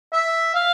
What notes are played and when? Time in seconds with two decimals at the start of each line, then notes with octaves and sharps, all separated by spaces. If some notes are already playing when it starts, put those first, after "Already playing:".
0.13 E5
0.55 F5